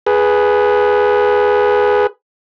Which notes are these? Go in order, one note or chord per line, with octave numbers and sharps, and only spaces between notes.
G#4 B4